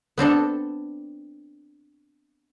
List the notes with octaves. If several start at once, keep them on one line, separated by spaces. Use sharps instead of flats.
B3 C4 D4 A4